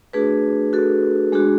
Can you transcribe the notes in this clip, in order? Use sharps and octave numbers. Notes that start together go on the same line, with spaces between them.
A3 D4 F#4 G#4 B4
F#4 A4
G#3 D4 F#4 G#4